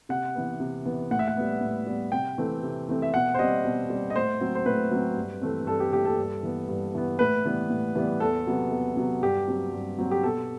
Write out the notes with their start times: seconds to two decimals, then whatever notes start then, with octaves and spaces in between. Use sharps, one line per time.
0.09 C3 F#5
0.35 E3 B3
0.60 C3
0.85 E3 B3
1.11 A2 F#5
1.19 E5
1.28 F#5
1.37 G3 B3
1.61 A2
1.86 G3 B3
2.12 C3 G5
2.38 E3 A3 C4
2.63 C3
2.89 E3 A3 C4
3.02 E5
3.14 B2 F#5
3.35 C5
3.39 G3 C4 D#5
3.65 B2
3.90 G3 C4
4.10 D#5
4.15 A2 C5
4.40 F#3 C4
4.55 C5
4.66 A2 B4
4.91 F#3 C4
5.17 G2
5.42 E3 A3 C4
5.67 G2 A4
5.80 G4
5.93 E3 A3 C4 G4
6.05 A4
6.18 G2
6.43 E3 B3
6.69 G2
6.95 E3 B3
7.19 A2 B4
7.45 E3 G3 B3
7.70 A2
7.95 E3 G3 B3
8.20 E2 A4
8.47 C3 F#3 B3
8.72 E2
8.97 C3 F#3 B3
9.22 G2 G4
9.48 F#3 C4
9.73 G2
9.98 F#3 C4
10.11 G4
10.23 B2 A4